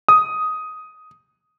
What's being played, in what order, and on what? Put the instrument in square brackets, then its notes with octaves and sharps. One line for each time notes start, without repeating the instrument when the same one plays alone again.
[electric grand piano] D#6